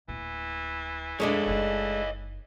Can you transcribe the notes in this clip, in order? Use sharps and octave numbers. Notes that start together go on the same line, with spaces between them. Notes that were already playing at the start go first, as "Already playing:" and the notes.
D1 E3 A#3
F2 G#3 A3 D4 C#5 D#5
F#1 E3 D#4